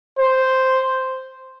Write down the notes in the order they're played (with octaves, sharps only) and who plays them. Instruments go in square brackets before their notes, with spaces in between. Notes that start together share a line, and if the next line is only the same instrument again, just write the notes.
[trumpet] C5